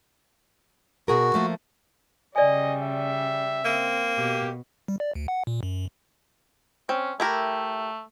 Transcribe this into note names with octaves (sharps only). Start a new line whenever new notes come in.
B2 F#4 G#4 A#4
F3 A3 A#3
C#3 G3 D5 D#5 G#5
E5
A#3 C4
B2 G4
G3
D5
D2
F#5
A#2
F#2
C4 C#4
A3 E4 G4 A#4